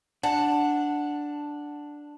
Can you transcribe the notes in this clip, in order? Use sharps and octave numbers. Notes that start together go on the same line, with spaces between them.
D4 F#5 A5